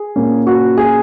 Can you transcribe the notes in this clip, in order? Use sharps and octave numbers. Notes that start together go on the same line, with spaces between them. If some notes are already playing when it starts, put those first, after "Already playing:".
Already playing: G#4
A#2 A#3 C#4
F#4
G#4